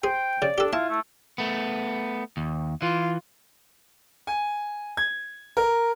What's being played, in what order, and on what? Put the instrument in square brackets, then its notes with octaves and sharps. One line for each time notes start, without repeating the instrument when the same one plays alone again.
[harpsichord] G#4 [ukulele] C5 [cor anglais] G5
[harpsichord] C#3 [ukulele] D5
[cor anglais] D4 [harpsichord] G4 A4
[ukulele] E4 [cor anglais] F4 [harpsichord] A5
[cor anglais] A3
[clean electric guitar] A3 B3
D#2
[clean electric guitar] E3 [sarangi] F4
[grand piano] G#5
G#6
A#4